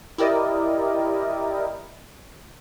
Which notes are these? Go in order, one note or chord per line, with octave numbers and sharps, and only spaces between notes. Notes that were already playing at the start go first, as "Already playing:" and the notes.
E4 G4 A#4 D5 D#5